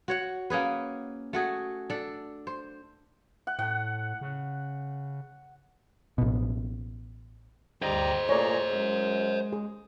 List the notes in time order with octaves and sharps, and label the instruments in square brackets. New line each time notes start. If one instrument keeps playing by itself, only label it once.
[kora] F#4 C#5 F#5
A#3 C#4 G#4 B4
A3 F#4 G#4
D4 A4
C5
[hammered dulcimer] F#5
[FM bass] A2 [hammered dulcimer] F#5
[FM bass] C#3
[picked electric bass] A1 B2
[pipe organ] D2 G4 A#5 [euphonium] G3 [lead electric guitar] C5 D#5
[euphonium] A#2 [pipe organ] A3 G#4 A#5 [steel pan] C#5 D5
[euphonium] F#2 [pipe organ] G#3
[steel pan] G#4